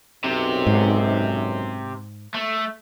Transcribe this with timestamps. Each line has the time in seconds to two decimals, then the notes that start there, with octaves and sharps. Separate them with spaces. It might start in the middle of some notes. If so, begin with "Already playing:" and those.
0.24 B1 F#2 C3
0.66 G#2
2.34 A3